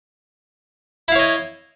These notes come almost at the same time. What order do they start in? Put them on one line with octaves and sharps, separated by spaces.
E4 F5 C#5 D#5